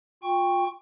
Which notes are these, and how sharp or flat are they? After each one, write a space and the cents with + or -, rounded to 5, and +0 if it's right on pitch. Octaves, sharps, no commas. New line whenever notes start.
F4 +25 G5 +20 C#6 +0